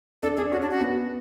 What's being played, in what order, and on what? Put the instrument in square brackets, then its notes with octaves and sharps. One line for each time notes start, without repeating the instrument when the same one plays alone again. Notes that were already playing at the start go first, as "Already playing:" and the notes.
[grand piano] D4 [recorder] A4
[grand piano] D4 [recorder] G#4
[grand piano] C#4 [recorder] F#4
[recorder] D4
F#4
[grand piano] B3